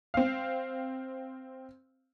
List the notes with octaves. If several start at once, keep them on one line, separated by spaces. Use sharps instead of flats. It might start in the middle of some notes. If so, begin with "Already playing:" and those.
C4 F5